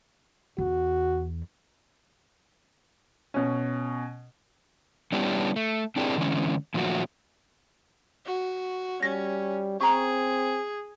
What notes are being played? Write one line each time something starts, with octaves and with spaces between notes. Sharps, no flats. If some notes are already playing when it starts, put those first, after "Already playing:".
E2 F#4
B2 C#4
G3 B3 C#4 D4 E4 G4
A3
C4 D4 E4 G4 G#4 A#4
D3 E3 G#3 C#4
A#2 D#3 F3 F#3 A3 F#4
F#4
G3 C#4 A#6
C4 G#4 A#5 C#6